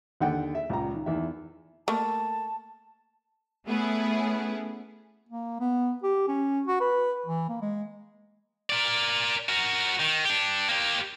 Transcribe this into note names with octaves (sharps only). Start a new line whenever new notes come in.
D#2 D3 F#5 G5
E5
C#2 A#2 A#5
D#3
E2 D#3 E4 E5
A3 A#3 A5
A3 B3 C#4 E4 G#4
A#3
B3
G4
C#4
F#4
B4
E3
A#3
G#3
A#4 D5
F#4 A#4
D#3
D4 G4
A#3 G4